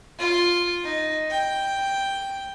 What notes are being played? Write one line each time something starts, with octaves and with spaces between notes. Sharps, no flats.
F4
D#4
G5